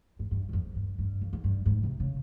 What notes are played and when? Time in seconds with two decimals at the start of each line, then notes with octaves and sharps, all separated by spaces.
0.19 G#2
0.31 G2
0.49 G2
0.53 F2
0.75 G2
0.99 G2
1.21 F2
1.33 G#2
1.44 G2
1.66 G#2
1.83 C3
2.00 C#3